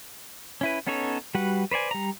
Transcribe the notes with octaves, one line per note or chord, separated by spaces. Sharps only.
C#4 E4 B4
B3 C#4 D#4 A4 C#5
G3 F#4 B4 F#5
B4 C5 D5 G#5
G3 A#5